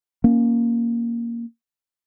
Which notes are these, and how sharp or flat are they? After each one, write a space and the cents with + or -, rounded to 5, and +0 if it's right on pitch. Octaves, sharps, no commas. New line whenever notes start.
A#3 +5 C#4 +0